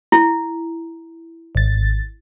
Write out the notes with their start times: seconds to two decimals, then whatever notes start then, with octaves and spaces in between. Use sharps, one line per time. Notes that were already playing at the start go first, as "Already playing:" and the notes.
0.12 E4
1.55 G#1 A6